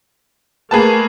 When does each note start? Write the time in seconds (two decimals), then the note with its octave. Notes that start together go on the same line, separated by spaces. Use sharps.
0.71 A3 A#3 G#4 B4 A5